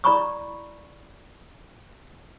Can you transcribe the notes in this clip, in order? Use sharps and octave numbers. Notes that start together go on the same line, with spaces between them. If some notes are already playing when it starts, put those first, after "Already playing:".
E4 D5 A#5 B5 C#6 D#6